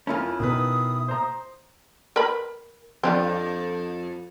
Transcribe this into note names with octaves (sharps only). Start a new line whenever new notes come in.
F2 C#4 E4 F4 A#4
B2 D#3 B4 D#6
C5 A#5
A#4 B4 B5
F2 C4 D4 F4